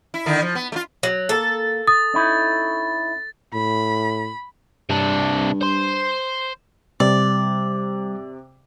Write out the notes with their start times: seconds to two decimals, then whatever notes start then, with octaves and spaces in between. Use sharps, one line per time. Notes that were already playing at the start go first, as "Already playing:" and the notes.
0.14 E4
0.26 D3 D#3 E4
0.42 F3
0.55 B3
0.72 A3 F4
1.03 F#3
1.29 A#3 A4
1.87 D#6 A6
2.14 C#4 D#4 E4
3.54 A2 B5
4.90 G2 C3 D4
5.61 C5 C6
7.00 C3 G3 D5